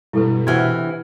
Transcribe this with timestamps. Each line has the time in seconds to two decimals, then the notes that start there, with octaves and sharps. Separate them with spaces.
0.13 G2 B2 E4 A4 B4
0.47 C3 E3 D4 F#5 F6 G#6